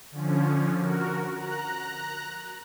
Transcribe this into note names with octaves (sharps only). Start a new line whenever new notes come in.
D3 F3 C#4
F#4 A#4
A#5 F#6